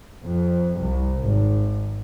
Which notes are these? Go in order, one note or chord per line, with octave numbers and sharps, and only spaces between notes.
F2
C2
G#1